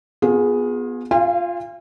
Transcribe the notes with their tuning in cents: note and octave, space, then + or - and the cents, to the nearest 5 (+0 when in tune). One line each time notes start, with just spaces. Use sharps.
B3 +0 F4 +35 G#4 +0
F4 +0 F5 -35 G#5 -40